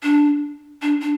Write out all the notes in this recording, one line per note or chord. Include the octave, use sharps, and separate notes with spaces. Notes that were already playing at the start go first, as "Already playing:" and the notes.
D4
D4
D4